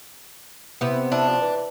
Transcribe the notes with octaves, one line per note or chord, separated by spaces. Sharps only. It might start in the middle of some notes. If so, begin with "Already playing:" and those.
C3 B3 E4
D4 E4
F3
E3